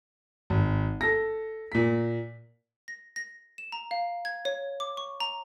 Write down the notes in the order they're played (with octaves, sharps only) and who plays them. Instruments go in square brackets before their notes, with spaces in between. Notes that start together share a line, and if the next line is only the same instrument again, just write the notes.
[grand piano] G#1
A4 A#6
A#2 B6
[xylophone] A#6
A#6
E7
A#5
F5
G#6
C#5
D6
C#6
A#5